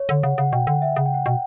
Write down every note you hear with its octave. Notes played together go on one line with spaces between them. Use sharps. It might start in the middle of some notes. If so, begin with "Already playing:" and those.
Already playing: C#5
D3
C#3 F#5
C#3 F#5
B2 G5
D3 F#5
E5
C#3 F#5
G5
F#5
B2 G5